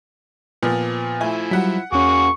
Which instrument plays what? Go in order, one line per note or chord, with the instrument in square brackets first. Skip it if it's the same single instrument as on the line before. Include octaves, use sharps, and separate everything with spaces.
[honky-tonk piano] A#2 F3 B3
[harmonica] F3 E4 [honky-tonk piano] A3 G#5
[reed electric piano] F#3 G3 [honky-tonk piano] F#5 B6
[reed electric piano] E2 C#4 [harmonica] A#3 F#4 G#4 [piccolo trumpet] C#6